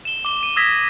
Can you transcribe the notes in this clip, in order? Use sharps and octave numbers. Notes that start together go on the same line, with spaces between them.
E7 G7
D6 G7
D#7 G7
D#6 E6 G#6 A#6 B6